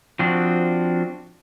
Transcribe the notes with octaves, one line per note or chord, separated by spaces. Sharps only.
F3 C4 D4 F#4